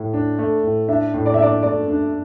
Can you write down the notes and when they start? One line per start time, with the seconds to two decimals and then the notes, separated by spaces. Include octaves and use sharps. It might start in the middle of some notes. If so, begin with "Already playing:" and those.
Already playing: A2
0.13 D4
0.39 A3
0.63 A2
0.88 D4 E5
1.14 A2
1.26 D5
1.34 E5
1.39 D4 D5
1.63 A3 D5
1.88 D4